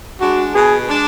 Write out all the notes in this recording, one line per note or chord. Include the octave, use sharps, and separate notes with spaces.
G#3 D4 F#4
B2 G#4
G#3 D4